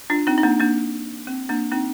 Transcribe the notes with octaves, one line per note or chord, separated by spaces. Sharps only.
D4 F4
C4 D#4
D#4
A#3 D4
A#3 D4
C4
A#3 D4
C4 D#4